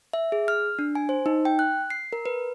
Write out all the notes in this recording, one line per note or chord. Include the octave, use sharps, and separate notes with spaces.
E5
G#4
F6
D4
G#5
C5
D#4
G5
F#6
C7
A#4
B4